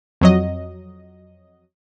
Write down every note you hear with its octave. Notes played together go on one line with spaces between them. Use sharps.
F2 F#3 D#5